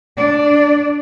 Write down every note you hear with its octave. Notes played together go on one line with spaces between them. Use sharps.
D4 D5